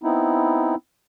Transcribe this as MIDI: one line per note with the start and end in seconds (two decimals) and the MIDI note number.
0.04 0.75 59
0.04 0.75 60
0.04 0.75 63
0.04 0.75 64